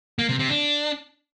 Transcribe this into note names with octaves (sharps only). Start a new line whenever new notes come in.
A#3
C3
C3
D4